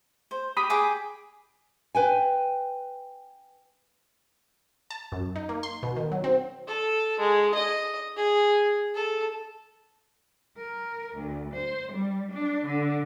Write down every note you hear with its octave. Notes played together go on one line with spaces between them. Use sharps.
C5
G4 B5 D#6 B6
G#4 G5 D6
B4 G5 G#5
A5
F#2
D#4
A#3
C6
B2
D#3
F#3
C4
A4
G#3
D#5
G#4
A4
A#4
D2
C5
G3
D4
D3